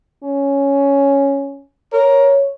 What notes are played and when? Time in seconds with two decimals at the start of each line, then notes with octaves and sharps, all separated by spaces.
0.24 C#4
1.93 A#4 C#5